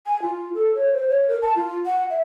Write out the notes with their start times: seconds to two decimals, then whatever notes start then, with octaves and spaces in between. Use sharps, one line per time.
0.06 G#5
0.22 F4
0.54 A4
0.75 C#5
0.93 C5
1.09 C#5
1.28 A#4
1.42 A5
1.56 F4
1.86 F#5
2.10 E5